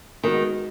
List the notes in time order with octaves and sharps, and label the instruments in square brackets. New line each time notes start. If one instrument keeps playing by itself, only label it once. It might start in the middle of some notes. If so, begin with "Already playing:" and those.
[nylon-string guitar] D#3 [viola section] G#3 B3 D#4 F#4